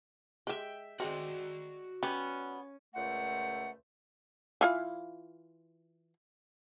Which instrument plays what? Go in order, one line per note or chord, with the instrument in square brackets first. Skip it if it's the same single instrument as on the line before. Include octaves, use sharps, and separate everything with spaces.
[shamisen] G#3 G4 [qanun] E5 G5
[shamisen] G#3 C4 [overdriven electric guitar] F#4 D5
[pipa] B3 [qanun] C#4 [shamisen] G4
[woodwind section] C#2 A#2 A3 C5 F#5
[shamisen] E3 F4 F5